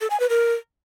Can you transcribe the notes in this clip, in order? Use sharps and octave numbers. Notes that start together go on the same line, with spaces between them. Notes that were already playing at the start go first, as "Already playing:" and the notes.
A4
G#5
B4
A#4